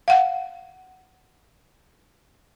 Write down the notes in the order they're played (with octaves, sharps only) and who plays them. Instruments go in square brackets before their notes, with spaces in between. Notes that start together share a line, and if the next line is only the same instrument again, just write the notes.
[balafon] F5 F#5